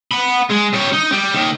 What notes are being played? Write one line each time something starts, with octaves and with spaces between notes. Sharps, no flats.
F#5 B5
G#3
G3 C#5
D#4
G3
D#2 D#3